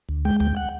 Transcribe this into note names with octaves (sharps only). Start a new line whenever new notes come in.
D2
G#3 G5
D2 G5
F#5